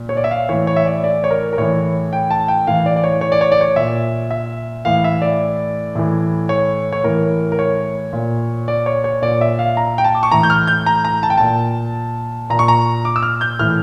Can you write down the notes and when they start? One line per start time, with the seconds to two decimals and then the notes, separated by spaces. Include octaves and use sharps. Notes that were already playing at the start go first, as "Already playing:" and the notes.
Already playing: A#2
0.09 C#5
0.17 D5
0.24 E5
0.31 F5
0.49 A2 E3 C#5
0.67 C#5
0.76 E5
0.86 D5
1.04 D5
1.24 C#5
1.30 A#4
1.53 A#4
1.58 A2 E3 C#5
2.13 G5
2.31 A5
2.48 G5
2.67 A2 E3 F5
2.86 D5
2.96 D5
3.04 C#5
3.21 C#5
3.32 D5
3.41 C#5
3.52 D5
3.61 C#5
3.76 A#2 E5
4.31 E5
4.85 A2 E3 F5
5.04 E5
5.22 D5
5.95 A2 E3
6.49 C#5
6.93 C#5
7.04 A2 E3 A#4
7.52 A#4
7.59 C#5
8.13 A#2
8.68 D5
8.86 C#5
9.04 C#5
9.22 A#2 D5
9.41 E5
9.59 F5
9.77 A#5
9.98 G5
10.04 A5
10.15 D6
10.23 C#6
10.32 A2 E3 A#5
10.43 G6
10.50 F6
10.67 G6
10.86 A#5
11.05 A#5
11.23 A5
11.30 G5
11.38 A#2 A5
12.50 A#2 A#5
12.59 C#6
12.68 A#5
13.05 D6
13.16 E6
13.23 F6
13.41 G6
13.59 A2 E3 F6